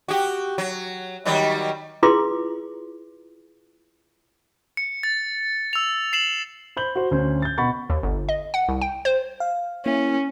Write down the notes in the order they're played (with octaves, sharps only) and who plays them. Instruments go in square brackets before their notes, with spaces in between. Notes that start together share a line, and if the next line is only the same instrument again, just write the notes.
[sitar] F#4 G4
F#3
D#3 F#3 G3
[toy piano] E4 F4 G#4 B4 C6 D6
[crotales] C#7
A6
E6 F7
C7 E7 F#7
[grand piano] C5 B5 G6 F#7
F#4 C5
D2 C#4 C5 G6
G6 A6
B2 F#5 B5 C#6 A6
[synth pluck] D#2
G1
D#5
F#5
C2
G5
C5
[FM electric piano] F5
[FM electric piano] A#3 E4 [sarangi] C#4